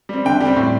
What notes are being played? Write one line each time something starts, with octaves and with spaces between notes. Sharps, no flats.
G3 C4
D3 G5
G3 C4
A2